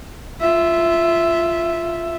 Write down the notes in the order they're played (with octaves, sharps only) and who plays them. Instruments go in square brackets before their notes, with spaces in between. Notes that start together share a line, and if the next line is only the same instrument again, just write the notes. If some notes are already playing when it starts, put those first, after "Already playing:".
[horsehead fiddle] F4 E5